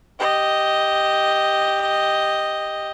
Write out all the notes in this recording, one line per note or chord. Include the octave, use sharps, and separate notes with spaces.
G4 D#5